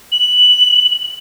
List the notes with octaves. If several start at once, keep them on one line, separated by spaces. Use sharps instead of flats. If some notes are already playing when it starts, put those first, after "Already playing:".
F#7